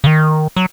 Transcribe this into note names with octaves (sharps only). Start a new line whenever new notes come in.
C#3
D#3
F#3